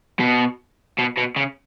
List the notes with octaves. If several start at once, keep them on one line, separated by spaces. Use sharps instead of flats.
B2
B2
B2
C#3